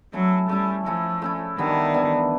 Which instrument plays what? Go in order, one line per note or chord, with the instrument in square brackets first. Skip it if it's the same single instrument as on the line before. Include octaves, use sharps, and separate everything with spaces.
[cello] F#3 [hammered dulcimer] A3 C#4 E4
[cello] G3 [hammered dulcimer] A3 C#4 E4
[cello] F3 [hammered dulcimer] A3 C#4 E4
[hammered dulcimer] A3 C#4 E4
[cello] D#3 [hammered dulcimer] E3 G3 B3 D4
[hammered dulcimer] E3 G3 B3 D4